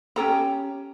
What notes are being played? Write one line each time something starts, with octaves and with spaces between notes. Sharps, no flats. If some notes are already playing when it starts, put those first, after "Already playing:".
C#4 G4 A4 A#5